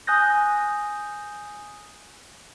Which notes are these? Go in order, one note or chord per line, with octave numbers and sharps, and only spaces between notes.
G#5 D#6 F#6 G6 A#6